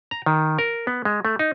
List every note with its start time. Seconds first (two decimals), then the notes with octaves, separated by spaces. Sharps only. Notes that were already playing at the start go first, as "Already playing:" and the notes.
0.11 A#5
0.26 D#3
0.59 A#4
0.87 B3
1.05 G#3
1.25 A3
1.39 D#4